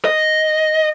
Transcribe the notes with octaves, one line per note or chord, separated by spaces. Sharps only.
D#5